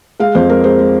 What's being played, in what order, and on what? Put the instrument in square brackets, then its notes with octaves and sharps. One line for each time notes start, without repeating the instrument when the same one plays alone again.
[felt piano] G#3 F5
F2 C5
G#3 A#4
G#3 C5
G#3